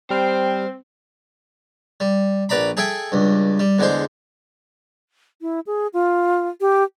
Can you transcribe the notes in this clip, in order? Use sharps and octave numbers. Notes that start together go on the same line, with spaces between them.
G3 C4 C5 G5 F6
G3
A#1 B4 D5 A#5 B5
G#4 A4 E5 G5 G#5
C#2 G2
G3
E2 D3 G#3 C5
E4
G#4
F4
G4